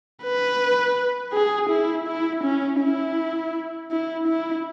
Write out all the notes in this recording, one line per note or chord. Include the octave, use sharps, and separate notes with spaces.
B4
G#4
E4
E4
C#4
E4
E4
E4